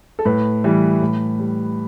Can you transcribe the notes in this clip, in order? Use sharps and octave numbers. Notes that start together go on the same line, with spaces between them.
A4
A2 B4
E3 G3
A2
G3